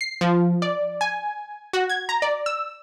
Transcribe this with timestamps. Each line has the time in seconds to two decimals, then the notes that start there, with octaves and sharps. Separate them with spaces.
0.01 C7
0.21 F3
0.62 D5
1.01 G#5
1.73 F#4
1.90 G#6
2.09 A#5
2.22 D5
2.46 E6